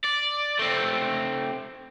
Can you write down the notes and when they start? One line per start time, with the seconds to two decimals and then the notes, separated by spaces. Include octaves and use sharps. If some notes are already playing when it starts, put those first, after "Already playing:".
0.04 D5
0.59 A3 C4